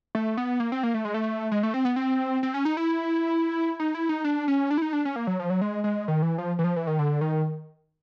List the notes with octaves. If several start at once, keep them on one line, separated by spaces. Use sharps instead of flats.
A3
B3
A#3
C4
A#3
A3
G#3
A3
G#3
A3
C4
B3
C4
C4
C#4
D#4
E4
D#4
E4
D#4
D4
C#4
D4
E4
D#4
D4
C#4
A#3
F#3
F3
F#3
G#3
G#3
D#3
E3
F3
E3
F3
E3
D#3
D3
D#3